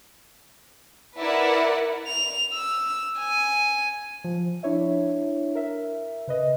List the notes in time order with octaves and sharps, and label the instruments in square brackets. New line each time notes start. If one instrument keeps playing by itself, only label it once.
[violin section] E4 A#4 B4 D5 E5 F#5
[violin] F7
E6
G#5
[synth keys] F3
D4 E4 C#5 E5
A#4 E5
C#3 B4 D#5